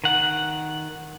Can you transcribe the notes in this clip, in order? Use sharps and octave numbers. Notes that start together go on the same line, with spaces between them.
D#3 F#5